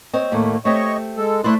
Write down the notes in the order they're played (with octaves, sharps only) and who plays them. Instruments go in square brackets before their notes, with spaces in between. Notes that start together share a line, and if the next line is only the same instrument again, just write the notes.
[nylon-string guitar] C4 C#5 D#5
[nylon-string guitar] D#2 A2 [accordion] A3 A#3
[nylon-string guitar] A3 C4 G4 [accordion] C#5 D#5 C#6
[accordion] G#3 A4
[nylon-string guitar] A3 C5 D5 [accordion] E4 C6 F#6